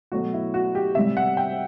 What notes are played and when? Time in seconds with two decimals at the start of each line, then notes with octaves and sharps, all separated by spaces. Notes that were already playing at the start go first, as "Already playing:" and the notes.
0.12 B2 F#3 A3 F#4
0.34 E4
0.54 F#4
0.75 G4
0.95 C3 G3 E5
1.17 F#5
1.37 G5